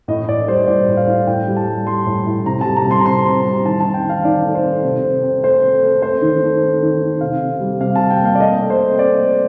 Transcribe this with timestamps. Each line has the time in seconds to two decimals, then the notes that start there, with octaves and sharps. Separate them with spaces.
0.08 A2 D#5
0.28 A2 D5
0.48 G3 C5
0.67 A2 D5
0.88 A2
0.97 F5
1.07 A2
1.27 A2 G5
1.48 G3
1.56 A5
1.67 G3
1.86 G3 C6
2.06 A2
2.26 A2
2.46 C3 A#5
2.61 G3 A5
2.76 A#5
2.85 C3
2.91 C6
3.00 A#5
3.05 C4 C6
3.25 C4 A#5
3.45 G3
3.65 D#3 A5
3.80 C4 A5
3.94 G5
4.04 D#3
4.09 F5
4.25 D#3 D5
4.45 A3
4.55 C5
4.63 C4
4.84 C3
5.03 C4
5.23 C4
5.44 A3 C5
5.64 C4
5.83 A3
6.02 A3 C5
6.22 D#3
6.42 A3
6.62 C4
6.82 D#3
7.01 A3
7.21 C3 F5
7.41 C3
7.60 G3
7.80 C3 F5
7.95 A5
8.01 G3
8.10 G5
8.20 A#3 F5
8.35 D5
8.39 A3 D#5
8.60 A3
8.70 C5
8.80 C4
8.99 C4 D5
9.20 A3